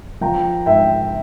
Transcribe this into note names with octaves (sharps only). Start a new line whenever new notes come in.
F3 G5 A#5
G#1 E5 G5